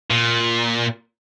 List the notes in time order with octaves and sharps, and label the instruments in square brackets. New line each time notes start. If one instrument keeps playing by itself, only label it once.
[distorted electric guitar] A#2